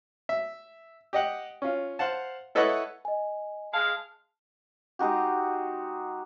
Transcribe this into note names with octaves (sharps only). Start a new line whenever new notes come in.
E5
G4 D#5 F#5
C#4 F4
C5 F5 F#5 A5
E4 A4 B4 C#5 D#5 F#5
D#5 G#5
G#3 F5 A5
G#3 D#4 F#4 G4